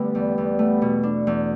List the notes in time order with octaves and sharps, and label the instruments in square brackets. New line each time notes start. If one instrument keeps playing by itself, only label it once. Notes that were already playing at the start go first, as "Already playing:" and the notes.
Already playing: [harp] D3 A3 [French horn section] G3 B3
[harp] E2
E2
A3
B2
D4
E2